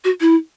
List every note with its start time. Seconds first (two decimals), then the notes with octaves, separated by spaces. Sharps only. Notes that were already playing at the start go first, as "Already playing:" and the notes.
0.04 F#4
0.21 E4